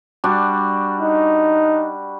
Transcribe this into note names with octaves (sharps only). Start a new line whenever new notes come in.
G3 D4 F#4
D#4